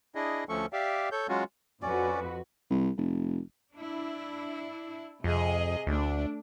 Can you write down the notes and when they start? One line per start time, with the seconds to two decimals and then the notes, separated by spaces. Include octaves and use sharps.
0.15 D4 E4 G#4 D#5
0.49 D2 F3 A3 C#4 A4 C#6
0.73 G4 D5 E5 F5
1.12 A4 C#5 G6
1.29 F#3 G#3 C#4 F4 F#4
1.82 F2 C#4 F#4 B4 D5
2.70 C2
2.97 F1
3.73 D4 E4
5.24 F2 C3 G#4 D#5
5.87 D2 A3 D4